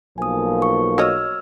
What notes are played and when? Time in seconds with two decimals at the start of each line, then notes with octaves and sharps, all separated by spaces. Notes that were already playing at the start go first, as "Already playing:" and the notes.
0.18 B1 F3 A#3 G#5 D#6
0.62 C#6
0.98 F#4 C#5 D#5 E6 F6 G#6